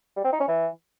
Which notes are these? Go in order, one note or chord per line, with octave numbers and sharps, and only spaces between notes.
G3
C4
D#4
C#4
E3